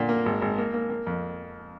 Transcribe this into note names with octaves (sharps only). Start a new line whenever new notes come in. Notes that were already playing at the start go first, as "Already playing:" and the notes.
Already playing: A#2 D3
A#3
G#1
G#1
A#3
A#3
A#3
F2